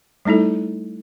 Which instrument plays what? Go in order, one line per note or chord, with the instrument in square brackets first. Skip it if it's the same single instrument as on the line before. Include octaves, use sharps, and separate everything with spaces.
[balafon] G3 A3 D#4 E4 A4